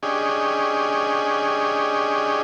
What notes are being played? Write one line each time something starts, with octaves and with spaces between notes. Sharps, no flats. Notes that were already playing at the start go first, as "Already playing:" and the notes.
C#4 D4 G4 G#4 D#5